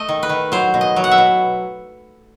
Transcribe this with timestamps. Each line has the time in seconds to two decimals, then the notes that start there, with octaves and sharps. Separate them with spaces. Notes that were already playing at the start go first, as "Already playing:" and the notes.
Already playing: A3 D#5
0.09 D#3
0.23 B4
0.29 D#3
0.52 F#3 C5
0.74 B2
0.81 D#5
0.96 F#3
1.04 F#5
1.11 E5
1.18 B2